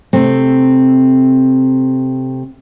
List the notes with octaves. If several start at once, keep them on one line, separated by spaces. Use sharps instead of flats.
C3 A3 C4